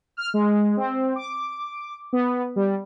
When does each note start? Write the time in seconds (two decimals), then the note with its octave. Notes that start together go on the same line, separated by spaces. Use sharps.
0.17 F6
0.34 G#3
0.77 C4
1.16 D6
2.13 B3
2.56 G3